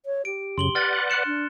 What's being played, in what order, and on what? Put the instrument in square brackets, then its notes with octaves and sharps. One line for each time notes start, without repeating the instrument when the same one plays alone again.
[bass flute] C#5
[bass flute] G4 [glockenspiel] D7
[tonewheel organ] F#2 C#3 [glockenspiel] C6 F#7 G7
[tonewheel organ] B4 D5 F#5 [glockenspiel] F6 A6
[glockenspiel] F#6 C#7 E7
[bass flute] D4